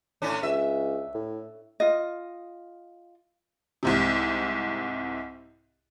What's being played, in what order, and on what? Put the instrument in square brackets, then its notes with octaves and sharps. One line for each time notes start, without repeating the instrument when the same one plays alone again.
[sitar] A2 C#4 D4
[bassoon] C#2 [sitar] E5
[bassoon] A2
[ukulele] F4 D#5
[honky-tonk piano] C2 G#2 C3